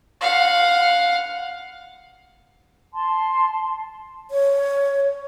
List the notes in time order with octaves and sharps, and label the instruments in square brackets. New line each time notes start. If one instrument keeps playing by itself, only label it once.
[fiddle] F5 F#5
[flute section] A5 C6
[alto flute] C#5